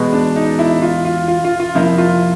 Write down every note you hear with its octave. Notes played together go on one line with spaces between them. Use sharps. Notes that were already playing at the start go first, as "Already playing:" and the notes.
Already playing: E2 B2 G#3 B3
D4
D#4
E4
F4
F4
F4
F4
F4
F2 C3 F3 A#3 E4
F4